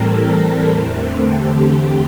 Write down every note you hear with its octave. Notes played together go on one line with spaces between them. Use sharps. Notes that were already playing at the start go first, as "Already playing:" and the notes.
Already playing: A2 E3 G3 C4 A4 A#4
E2 D3 A3 C4
G4